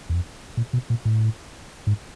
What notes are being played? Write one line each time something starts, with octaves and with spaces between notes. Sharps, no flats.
E2
F2
A#2
B2
A#2
A2
G#2